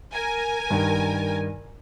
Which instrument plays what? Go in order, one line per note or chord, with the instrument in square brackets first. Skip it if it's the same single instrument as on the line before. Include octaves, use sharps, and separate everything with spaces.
[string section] A#4 G#5
[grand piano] G2 D#3